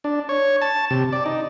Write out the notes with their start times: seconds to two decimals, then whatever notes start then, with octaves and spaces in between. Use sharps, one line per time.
0.04 D4
0.29 C#5
0.62 A5
0.90 C3
1.13 D5
1.26 D#4